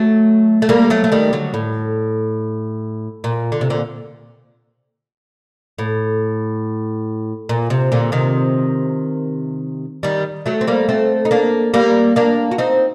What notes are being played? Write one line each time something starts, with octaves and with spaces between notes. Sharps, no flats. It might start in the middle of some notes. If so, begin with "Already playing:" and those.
Already playing: F#3 A3
A3
G3 A#3
F#3 A3
A3
D#3 G3
D3 F#3
A2
A#2
D3
C3
A#2 D3
A2
A#2
C3
A#2 D3
C3 D#3
D#3 G3
F#3 A3
C4
G3 A#3
A3 C4
D#4
A#3 D4
G3 A#3
A#3 D4
F#4
C4 D#4